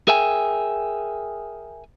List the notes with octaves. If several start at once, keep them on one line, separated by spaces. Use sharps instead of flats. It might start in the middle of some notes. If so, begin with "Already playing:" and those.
G#4 A#4 E5 G5 G#5